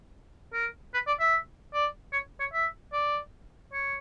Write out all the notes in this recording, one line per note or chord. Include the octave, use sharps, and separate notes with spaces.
A#4
B4
D5
E5
D5
C#5
C#5
E5
D5
C#5